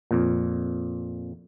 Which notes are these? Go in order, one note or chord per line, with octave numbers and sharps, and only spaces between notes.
F2 A#2